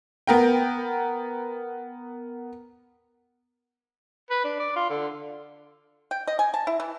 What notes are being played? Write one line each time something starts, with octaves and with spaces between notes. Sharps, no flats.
B3 A#4 G5
B4
D4
D5
F4
D3
G5
D#5
G#5
A5
E4
E3